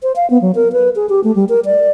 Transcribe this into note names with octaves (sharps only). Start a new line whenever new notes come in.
C5
F5
B3
F#3
A#4
B4
G#4
G4
A3
G3
A#4
D5